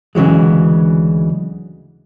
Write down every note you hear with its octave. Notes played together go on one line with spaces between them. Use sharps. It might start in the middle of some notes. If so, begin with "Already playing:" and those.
D2 C#3 E3 F#3 G#3